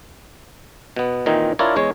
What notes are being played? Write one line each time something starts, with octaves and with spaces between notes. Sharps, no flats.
B2 B3
A#2 D#3 E3 C4 D#4
D4 E4 F4 A#4 C#5 D5
E2 G#3 C#5